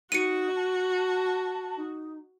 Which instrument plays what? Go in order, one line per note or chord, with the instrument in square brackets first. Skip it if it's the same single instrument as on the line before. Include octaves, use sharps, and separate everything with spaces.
[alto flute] D#4 [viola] F#4 [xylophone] C#7 D#7
[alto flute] A5
D#4